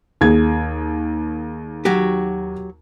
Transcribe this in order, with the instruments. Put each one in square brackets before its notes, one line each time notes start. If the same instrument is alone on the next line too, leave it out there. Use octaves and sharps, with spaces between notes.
[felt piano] D#2 G#4 G#6
[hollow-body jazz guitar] F#3 F#4 G4